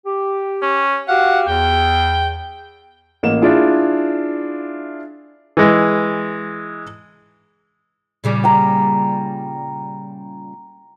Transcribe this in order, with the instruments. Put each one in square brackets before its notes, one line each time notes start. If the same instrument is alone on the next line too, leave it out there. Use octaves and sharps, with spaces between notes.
[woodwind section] G4
[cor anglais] C#4
[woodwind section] F#4 G4 F5 [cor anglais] F#5
[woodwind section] E2 [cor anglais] G5
[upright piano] A1 A#3 E7
D4 E4 F4 G#4
[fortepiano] E3 G#3
[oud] A#2 C#3 G3
[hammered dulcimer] G5 A#5